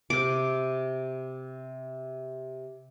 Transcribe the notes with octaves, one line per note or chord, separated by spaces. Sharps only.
C3 D6